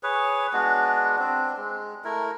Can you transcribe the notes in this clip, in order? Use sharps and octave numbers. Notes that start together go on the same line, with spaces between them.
G#4 B4 C#5
G#3 B3 D4 F#4
C4 D4
G#3
A3 E4 A#4